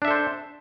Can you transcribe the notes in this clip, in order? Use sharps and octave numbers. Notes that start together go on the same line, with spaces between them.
D4 A4 C5 E5